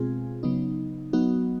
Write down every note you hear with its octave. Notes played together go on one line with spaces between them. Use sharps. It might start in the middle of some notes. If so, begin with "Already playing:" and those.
Already playing: B2 G#3 C4 F4 G#4
C#3 F#3 B3 D#4
F#3 B3 D#4 F#4